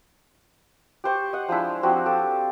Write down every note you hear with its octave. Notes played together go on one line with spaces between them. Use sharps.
G4 C5 C#6
D#5 F#5
F3 G#3 D4 E4
F3 C4 F#4 G4
G4 A4